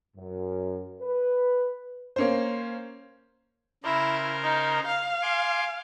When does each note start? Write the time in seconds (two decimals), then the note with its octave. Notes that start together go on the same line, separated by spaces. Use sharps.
0.17 F#2
1.01 B4
2.16 A#3 C#4 C5
3.84 C#3 E4 A#4 C5
4.44 D#4
4.87 F5
5.22 G#5 C6 D6